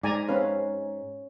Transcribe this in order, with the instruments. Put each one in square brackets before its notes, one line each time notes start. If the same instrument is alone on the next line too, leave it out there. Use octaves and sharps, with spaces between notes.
[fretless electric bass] G#2 [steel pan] D5 G#5 A#5
[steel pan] C4 B4 F5 [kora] C#4